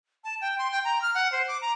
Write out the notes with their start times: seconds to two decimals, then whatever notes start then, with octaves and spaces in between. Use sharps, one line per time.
0.24 A5
0.41 G5
0.58 C6
0.72 G5
0.85 A#5
1.02 F6
1.15 F#5
1.32 C5
1.48 D6
1.62 A#5